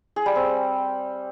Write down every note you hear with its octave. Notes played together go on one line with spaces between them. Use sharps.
G#4
G3
C4